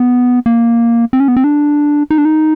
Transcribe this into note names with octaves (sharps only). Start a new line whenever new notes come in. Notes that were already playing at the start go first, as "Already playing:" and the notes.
Already playing: B3
A#3
C4
C#4
B3
C4
D4
D#4
D4
D#4